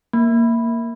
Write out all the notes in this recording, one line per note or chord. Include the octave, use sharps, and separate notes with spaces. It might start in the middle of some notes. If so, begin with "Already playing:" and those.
A#3